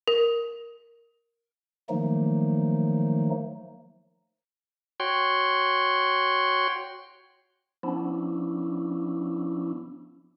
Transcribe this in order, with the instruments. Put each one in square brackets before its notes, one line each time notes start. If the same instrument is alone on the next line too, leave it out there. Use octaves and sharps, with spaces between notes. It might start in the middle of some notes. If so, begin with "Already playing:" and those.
[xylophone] A#4
[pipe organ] D#3 F3 F#3 A3 A#3 D#4
[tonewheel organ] F#4 C#5 G5 C6
F3 B3 C#4 D4 E4